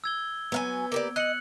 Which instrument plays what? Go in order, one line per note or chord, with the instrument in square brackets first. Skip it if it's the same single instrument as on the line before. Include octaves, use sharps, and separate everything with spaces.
[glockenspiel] E6 G#6 G7
[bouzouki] F#3 F5 G#5 [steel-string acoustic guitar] B3
[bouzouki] A#3 G4 D5
[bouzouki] D#5 [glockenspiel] F#6 C#7 F#7